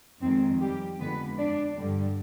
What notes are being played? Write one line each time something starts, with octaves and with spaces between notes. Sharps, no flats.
F2 D#3 G#3 C4
G3 G4
F2 D3 G#3 B3 B4
D4 D5
G2 D3 G3